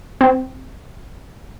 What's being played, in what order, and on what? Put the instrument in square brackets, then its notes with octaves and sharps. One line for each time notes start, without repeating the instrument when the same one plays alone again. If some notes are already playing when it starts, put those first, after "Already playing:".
[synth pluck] C4